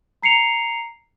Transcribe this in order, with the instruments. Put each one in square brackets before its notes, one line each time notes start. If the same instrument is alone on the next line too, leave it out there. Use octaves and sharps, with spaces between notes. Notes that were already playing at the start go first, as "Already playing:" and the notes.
[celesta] A#5 C7 C#7 F7